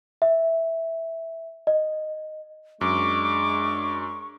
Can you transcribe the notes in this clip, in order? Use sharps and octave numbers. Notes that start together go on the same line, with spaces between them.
E5
D#5
F#2 G#3 D4 C#6 D6